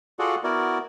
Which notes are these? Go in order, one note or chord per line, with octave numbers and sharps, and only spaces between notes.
F4 F#4 G#4 A4 D5 F#5
B3 E4 F#4 A#4 D5